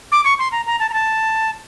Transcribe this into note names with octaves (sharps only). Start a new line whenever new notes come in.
D6
C#6
C6
A#5
A#5
A5
A#5
A5